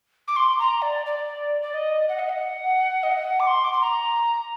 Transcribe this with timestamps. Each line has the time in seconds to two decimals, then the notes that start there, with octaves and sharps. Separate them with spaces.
0.28 D6
0.36 C6
0.59 A#5
0.82 D5
1.06 D5
1.62 D5
1.74 D#5
2.09 F#5
2.19 D#5
2.29 F#5
3.03 D#5
3.11 F#5
3.40 D6
3.47 C6
3.64 D6
3.72 C6
3.81 A#5